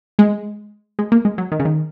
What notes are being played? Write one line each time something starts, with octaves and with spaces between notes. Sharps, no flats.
G#3
G#3
A#3
G#3
F#3
D#3
C#3
D#3